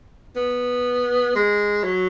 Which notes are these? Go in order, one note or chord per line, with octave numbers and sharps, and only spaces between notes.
B3
G#3
F#3